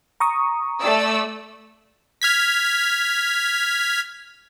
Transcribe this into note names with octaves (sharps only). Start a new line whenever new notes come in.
A#5 C#6 D#6
A3 D5 E6
F6 G#6 B6